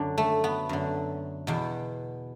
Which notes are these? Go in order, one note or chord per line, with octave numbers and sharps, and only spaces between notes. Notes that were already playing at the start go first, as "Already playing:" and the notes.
Already playing: F#2 D3 D4
A3
B3
F#2 D3
E2 B2